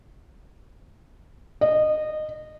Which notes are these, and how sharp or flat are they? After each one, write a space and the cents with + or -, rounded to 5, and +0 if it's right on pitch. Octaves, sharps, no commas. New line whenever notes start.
D#5 -20